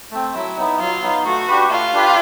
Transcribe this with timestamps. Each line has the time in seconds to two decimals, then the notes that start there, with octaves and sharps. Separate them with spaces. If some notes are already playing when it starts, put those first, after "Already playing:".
0.11 A3 C4
0.34 F#3 E4
0.57 B3 D#4
0.80 F#3 F4
1.02 B3 D#4
1.25 A3 F#4
1.47 D4 G4 B4
1.70 A3 F4
1.93 D4 G4 B4